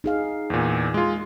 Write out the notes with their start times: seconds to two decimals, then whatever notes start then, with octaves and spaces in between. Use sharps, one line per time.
0.04 D#4 G#4 F5
0.50 E2 A#2
0.94 G#3 F4